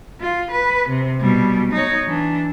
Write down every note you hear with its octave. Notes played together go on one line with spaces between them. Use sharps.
F4
B4
C3
B2 G3
D#4 C#5
E3 D4